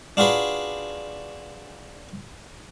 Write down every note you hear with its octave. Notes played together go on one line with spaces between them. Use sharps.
D4 F4 F#4 G#4 B4